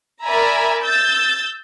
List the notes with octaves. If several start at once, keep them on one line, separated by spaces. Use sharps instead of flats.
A#4 D5 E5 G#5 A#5 B5
E6 G6 A6